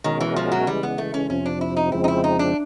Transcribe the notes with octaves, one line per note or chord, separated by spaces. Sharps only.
B2 D#3 G#3 C#4 F#4 A#4
E3
F3
F#3
C#3 E3 G3 G#3
B3
A3
C#4
F2 C3 F3 C#4
D4
E4
D#4
F2 C#3 F3 G#3 C4 E4
D#4
E4
D#4
D4